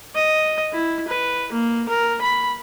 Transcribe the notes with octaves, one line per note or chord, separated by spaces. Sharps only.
D#5
E4
B4
A#3
A#4
B5